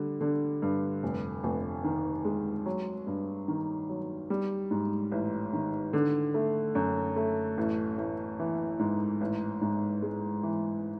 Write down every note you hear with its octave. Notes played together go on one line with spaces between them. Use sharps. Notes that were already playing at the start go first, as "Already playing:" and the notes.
Already playing: D3 G3
D3
G2
F1
F1
D#3
G#3
F#3
G2
D#3
F#3
G3
G#2
A1
D#3
D3
A3
F#2
A3
A1
A1
E3
G#2
A1
G#2
G#3
E3